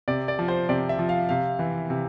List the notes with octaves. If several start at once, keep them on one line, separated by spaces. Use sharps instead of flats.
C3 D5
D5
F3
C5
C3 D5
E5
F3
F5
C3 F5
E3
C3